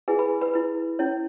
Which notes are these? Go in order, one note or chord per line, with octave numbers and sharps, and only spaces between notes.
E4 G#4 B4 G#5
B4 B5
B4 B5
E4 B4
C#4 E4 C#5